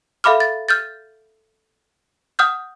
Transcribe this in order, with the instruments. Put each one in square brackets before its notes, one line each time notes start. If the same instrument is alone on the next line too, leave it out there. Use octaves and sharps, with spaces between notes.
[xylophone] A4 E5 F5 B5 D6 F6
A6
F6 G6 A6
F#5 D#6 F6 G6